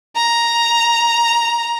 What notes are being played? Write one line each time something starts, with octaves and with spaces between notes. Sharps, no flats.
A#5